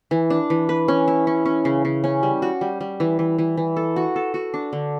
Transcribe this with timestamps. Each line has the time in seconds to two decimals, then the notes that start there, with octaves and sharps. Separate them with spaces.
0.11 E3
0.30 D4
0.50 E3
0.69 B4
0.88 C#4
1.08 E4
1.27 C#4
1.45 C#4
1.65 C#3
1.85 C#3
2.04 C#4
2.23 G3
2.42 F#4
2.61 G3
2.81 G3
3.00 E3
3.19 E3
3.38 E3
3.57 E3
3.77 A4
3.96 F#4
4.16 A4
4.34 F#4
4.54 D4
4.73 D3